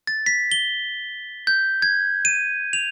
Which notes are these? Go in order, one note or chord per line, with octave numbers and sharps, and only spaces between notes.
A6
B6
G7
G6
G#6
D#7
F7